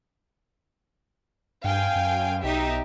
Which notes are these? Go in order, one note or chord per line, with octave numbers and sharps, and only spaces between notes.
G2 F5 G5 G#5
F#2
B1 D#4 G4 E5